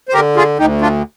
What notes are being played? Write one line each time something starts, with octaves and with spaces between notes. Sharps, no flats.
C5
D3 G4 A#4
F4 G#4
D2 D#4 G4
D4 F4